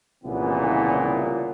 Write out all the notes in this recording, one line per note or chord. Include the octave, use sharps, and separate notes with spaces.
C2 A#2 C#3 E3 F3 B3